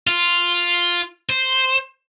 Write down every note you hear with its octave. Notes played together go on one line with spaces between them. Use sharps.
F4
C5